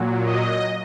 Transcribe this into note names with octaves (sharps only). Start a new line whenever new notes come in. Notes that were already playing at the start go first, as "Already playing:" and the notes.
Already playing: A#2 F#3
D#5